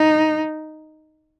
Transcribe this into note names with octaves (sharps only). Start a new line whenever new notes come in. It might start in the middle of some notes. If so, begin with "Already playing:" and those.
Already playing: D#4